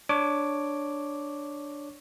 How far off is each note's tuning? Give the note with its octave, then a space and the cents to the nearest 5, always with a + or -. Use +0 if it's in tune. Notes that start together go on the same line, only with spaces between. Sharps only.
D4 +0 C#5 +0 D6 +0